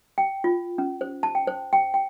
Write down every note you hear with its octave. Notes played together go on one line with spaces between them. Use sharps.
G5
F4
C#4
C5
A5
G5
C5
G5
G5